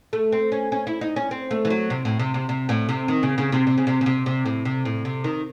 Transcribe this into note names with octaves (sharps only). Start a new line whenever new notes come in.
A3
C4
C#4
C#4
E4
D#4
C#4
C4
A3
E3
F#3
C3
A2
C3
C3
C3
A2
C3
D#3
C#3
C#3
C3
C3
C#3
C3
C#3
C3
C3
A2
C3
A2
C3
D#3